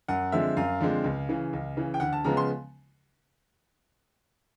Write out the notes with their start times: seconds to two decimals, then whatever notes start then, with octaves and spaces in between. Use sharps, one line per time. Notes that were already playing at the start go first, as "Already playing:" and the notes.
0.08 F#2 F#5
0.32 D3 F3 G#3 C4 E5
0.57 F#2 F5
0.80 D3 F3 G#3 C4
1.04 C#2
1.29 C#3 E3
1.53 C#2
1.77 C#3 E3
1.94 G5
2.00 D2 F#5
2.13 A5
2.24 C#3 F3 G#3 B3 A#5
2.37 C6